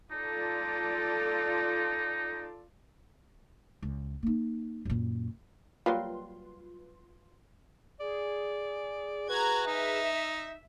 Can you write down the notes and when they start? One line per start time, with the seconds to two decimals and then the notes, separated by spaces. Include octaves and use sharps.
0.12 D#4 F4 A4 D5
3.82 C#2
4.23 A#3 D#4
4.85 F#2 A#2
5.86 F#3 G3 A#3 F4 B4 C6
8.00 G#4 D5
9.29 F#4 B4 A#5 G#6
9.67 D#4 E5